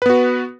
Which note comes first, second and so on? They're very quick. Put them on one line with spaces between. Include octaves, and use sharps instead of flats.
B4 B3 F#4